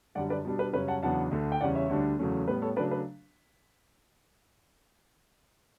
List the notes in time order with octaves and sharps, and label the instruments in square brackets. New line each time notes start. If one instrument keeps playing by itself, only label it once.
[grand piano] F#2 D3 G3 D5 F#5
B4 D5
B2 G3 B3 D4
B4
F#2 C#3 G3 C#4 B4
F#5 A5
E2 C#3 F#3 B3 D4 F#5 A5
D2 D3 A3 D4
G5
E2 C#3 G3 C#4 D5 F#5
C#5 E5
D2 D3 G3 D4
E2 C#3 F#3 A3 C#4
A2 G3 B3 B4
A4 C#5
C#3 F#3 A3 D4 B4 D5
B4